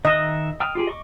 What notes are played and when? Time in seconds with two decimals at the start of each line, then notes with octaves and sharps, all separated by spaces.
0.05 D#3 D#5 E5 F#6
0.60 G5 D#6 F6
0.75 F4 G4 G#4
0.87 D#5 C#6 D6